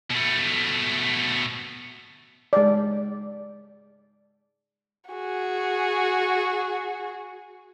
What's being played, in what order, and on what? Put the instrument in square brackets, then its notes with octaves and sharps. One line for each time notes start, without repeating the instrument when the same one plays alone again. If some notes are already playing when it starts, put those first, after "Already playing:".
[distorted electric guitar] B2 A3
[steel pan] G#3 D5
[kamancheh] F#4 G#4